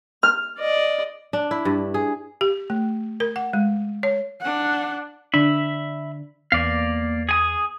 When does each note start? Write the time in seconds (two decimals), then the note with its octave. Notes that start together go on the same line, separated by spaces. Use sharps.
0.23 F6
0.59 D5 D#5
1.33 D4
1.51 E4
1.65 G2
1.94 G#4
2.41 G4
2.70 A3
3.20 A#4
3.36 F#5
3.53 G#3
4.03 C#5
4.41 D4 F#5
5.34 D3 D4 E5 B5
6.52 E2 A#3 B3 D5 F5
7.29 G#4 G#5 D#6